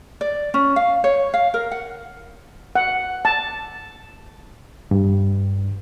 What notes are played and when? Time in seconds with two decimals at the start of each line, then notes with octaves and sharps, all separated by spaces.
0.21 D5
0.54 C#4
0.76 F5
1.04 C#5
1.34 F5
1.54 A#4
1.71 F#5
2.75 F#5
3.25 A5
4.91 G2